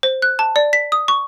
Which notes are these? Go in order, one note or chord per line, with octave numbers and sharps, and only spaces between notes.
C5
F#6
A5
D5
B6
D#6
C#6